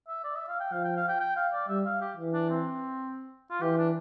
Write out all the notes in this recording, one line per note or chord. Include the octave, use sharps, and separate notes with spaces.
E5
D5
E5
F5
G5
F3 F5
G5
F5
G5
G5
F5
D5
G3 E5
F5
G4
E3
D4
C4
F4
E3 G4
D4